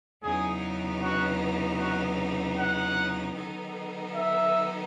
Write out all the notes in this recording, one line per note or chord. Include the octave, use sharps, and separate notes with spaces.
E2 C#3 F#3 B3 D#4 G#4
F#4
F#4
F#5
D#3 F#3 B3 D#4 A4
E5